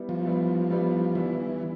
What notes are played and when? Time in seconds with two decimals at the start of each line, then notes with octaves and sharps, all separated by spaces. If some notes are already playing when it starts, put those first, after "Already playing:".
Already playing: G3 B3 E4
0.09 F3
0.25 G3 B3 E4
0.70 G3 B3 E4
1.15 E3 G3 B3 E4